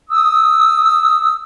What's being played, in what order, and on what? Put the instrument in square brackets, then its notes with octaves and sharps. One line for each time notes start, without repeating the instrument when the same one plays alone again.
[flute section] D#6 E6